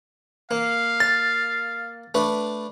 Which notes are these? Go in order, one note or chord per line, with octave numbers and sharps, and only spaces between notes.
A#3 F5
A6
A3 D4 B4